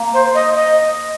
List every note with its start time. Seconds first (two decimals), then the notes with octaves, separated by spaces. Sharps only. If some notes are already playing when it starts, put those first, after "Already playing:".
Already playing: A#3
0.14 C5
0.35 D#5
0.55 D#5